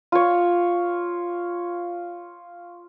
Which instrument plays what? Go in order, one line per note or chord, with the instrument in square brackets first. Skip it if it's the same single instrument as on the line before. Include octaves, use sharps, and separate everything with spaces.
[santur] F4 C#5